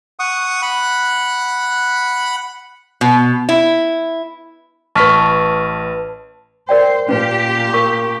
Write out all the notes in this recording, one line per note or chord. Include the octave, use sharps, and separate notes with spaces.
F#5 C#6 D#6
F#5 B5 F#6
B2
E4
A1 B4 A5 C#6 F6 B6
A#4 C5 D5 G5
A#2 C#4 G4 B4
A#4 C#6